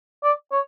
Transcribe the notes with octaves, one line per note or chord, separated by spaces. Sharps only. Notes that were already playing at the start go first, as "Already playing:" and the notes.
D5
C#5